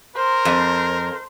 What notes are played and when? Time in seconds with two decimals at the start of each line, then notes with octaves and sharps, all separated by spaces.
0.16 A#4 C5
0.45 F2